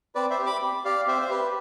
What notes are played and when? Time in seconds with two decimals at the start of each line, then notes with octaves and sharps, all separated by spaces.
0.15 C4 B4 D5
0.30 C5 E5
0.39 G4
0.46 B5 D6
0.62 C4
0.85 G4 D5 F5
1.07 C4 C5 E5
1.22 C5
1.30 G4 B4